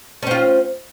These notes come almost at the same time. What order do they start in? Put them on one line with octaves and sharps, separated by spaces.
C#4 C4 F4